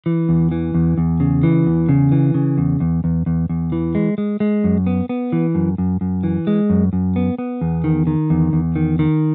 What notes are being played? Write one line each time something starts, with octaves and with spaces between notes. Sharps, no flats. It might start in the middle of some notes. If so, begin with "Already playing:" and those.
E3
E2
E3
E2
E2
C#3
E3
E2
C#3
E3
C#3
E2
E2
E2
E2
E2
E3
G#3
G#3
G#3
F#2
B3
B3
E3
F#2
F#2
F#2
E3
G#3
F#2
F#2
B3
B3
E2
D#3
D#3
E2
E2
D#3
D#3